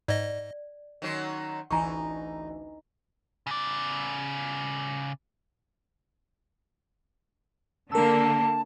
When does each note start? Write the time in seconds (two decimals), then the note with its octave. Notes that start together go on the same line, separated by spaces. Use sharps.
0.08 G#2 D5 D#5
1.02 D#3 F#3 C#4 F#5 C6
1.71 A1 D2 E3 D#4 G#5 A#5 C#6
3.47 C#3 D5
7.92 D3 A#3 A#4 A5 E6